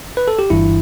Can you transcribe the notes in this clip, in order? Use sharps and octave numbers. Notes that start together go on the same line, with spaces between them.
B4
A4
G4
G1 G2 E3 E4